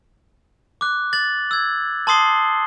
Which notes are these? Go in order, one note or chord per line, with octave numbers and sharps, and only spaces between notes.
D6 F#6
A6 F#7
E6 G#6
A5 C6 D#6 C7 G7